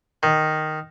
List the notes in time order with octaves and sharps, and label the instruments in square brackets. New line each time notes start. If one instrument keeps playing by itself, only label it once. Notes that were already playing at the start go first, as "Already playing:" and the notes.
[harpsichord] D#3